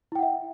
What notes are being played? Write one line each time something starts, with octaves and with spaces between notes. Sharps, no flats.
E4 E5 F#5 G5